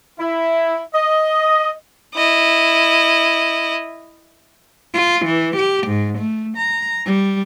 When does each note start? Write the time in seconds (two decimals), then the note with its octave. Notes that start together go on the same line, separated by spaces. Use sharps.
0.19 E4
0.94 D#5
2.15 E4 D#5
4.93 F4
5.26 E3
5.55 G4
5.86 G#2
6.18 A3
6.57 A#5
7.06 G3